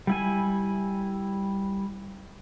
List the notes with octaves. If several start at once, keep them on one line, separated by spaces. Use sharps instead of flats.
G3 E4 G#5